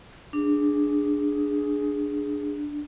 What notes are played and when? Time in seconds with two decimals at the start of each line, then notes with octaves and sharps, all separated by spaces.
0.33 D4 G#4